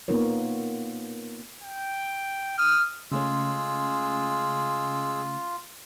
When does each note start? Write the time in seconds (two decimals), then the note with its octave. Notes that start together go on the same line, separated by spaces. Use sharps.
0.08 A#3 B3 D#4 F4 A#4 C#5
1.62 G5
2.58 D#6 F6
3.12 C#3 G#3 A3 C#4 F4 G#4 E6